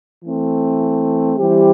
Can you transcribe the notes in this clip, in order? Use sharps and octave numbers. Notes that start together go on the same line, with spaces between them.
E3 A3 C4
E3 G3 C4 G4